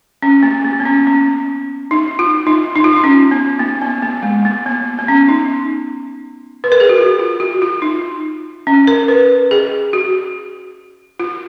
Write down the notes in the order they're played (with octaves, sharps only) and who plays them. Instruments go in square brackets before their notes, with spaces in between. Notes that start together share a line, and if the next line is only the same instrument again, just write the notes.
[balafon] C#4
A#3
A#3
B3
C#4
C#4
D#4
F4
D#4
D#4
F4
D#4
C#4
B3
A#3
B3
A#3
G#3
A#3
B3
B3
C#4
D#4
B4
A#4
G#4
F#4
F4
F4
F#4
F4
D#4
C#4
A#4
B4
G#4
F#4
F4